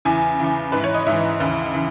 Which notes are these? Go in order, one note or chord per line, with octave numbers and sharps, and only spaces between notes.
E2 C#3 E3 G#5
E2 C#3 E3
G#2 E3 B4
C#5
D#5
G#2 E3 E5
D#2 C#3 E3
C#3 E3